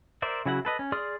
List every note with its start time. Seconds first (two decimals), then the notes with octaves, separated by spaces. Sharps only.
0.22 A#4 C5 D5 E5
0.46 C#3 F#3 E4 F#4 F#5
0.65 A4 B4 D#5
0.79 C#4
0.92 G#4 D5 C6 D#6 F6